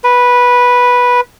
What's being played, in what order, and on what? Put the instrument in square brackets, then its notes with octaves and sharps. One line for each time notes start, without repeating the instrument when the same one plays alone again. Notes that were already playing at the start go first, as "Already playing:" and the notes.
[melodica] B4